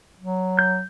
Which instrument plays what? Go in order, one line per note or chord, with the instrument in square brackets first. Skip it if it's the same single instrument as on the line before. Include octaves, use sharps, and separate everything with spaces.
[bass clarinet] F#3
[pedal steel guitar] G6